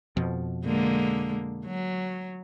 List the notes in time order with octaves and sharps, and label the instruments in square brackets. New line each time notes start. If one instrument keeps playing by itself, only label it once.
[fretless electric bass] F2 B2 F3
[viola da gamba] D3 G#3 A#3
F#3